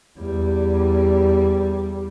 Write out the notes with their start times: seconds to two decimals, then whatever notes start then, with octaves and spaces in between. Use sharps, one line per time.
0.18 E2 G3